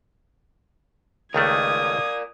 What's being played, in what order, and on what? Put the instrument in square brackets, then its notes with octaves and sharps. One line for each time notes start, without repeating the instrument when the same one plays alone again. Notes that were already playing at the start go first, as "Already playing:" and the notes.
[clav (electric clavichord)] C#2 D#3 A3 [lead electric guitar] A#4 D5 [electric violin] D#6 G#6